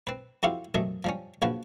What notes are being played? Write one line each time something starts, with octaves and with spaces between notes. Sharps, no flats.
C4 B4
F2 E4 F#4 G4 C5 F5
A1 F#2 C3 A3 D#5
F3 G3 C#4
A#1 C#3 F3 F#4 B4